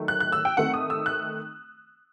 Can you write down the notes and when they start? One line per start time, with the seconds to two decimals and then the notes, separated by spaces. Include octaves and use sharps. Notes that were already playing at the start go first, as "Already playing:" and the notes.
Already playing: D#3 F#3 A3
0.08 F#6
0.20 F#6
0.32 E6
0.45 G5
0.57 D#3 A3 C4 F#5
0.74 D#6
0.90 E6
1.06 F#6